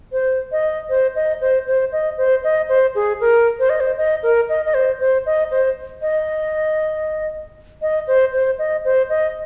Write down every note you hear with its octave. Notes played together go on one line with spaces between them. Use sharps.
C5
D#5
C5
D#5
C5
C5
D#5
C5
D#5
C5
G#4
A#4
C5
D#5
C5
D#5
A#4
D#5
D#5
C5
C5
D#5
C5
D#5
D#5
C5
C5
D#5
C5
D#5